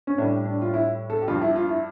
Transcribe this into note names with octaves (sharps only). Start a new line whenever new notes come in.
C#4
A2 G3 D4
D4
F4
E4
A4
G4
G2 F3 F4
E4
F4
E4